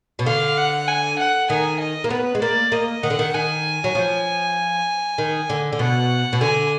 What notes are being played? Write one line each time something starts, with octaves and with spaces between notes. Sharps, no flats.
B2
D3 F5
F#5
G#5
F#5
D#3 G#5
D#5
A#3
B3 B4
G#3
A#3 D5
A#3 D#5
D#3 F#5
D3
D#3
D#3 G#5
F#3
F3
D#3
D3
D3
B2 F#5
B2
D3 G#5